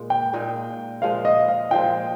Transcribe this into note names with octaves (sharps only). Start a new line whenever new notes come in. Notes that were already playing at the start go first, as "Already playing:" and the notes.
Already playing: A#2 G#3
G5
A#2 G#3 D#4
A#2 F3 G#3 F5
D#5
F5
A#2 F3 G#3 G5